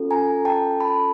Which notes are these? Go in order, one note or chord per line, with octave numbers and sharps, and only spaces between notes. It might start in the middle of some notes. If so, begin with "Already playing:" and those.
Already playing: C#4 F4 A4
G#5 A#5
G5 A5
A5 B5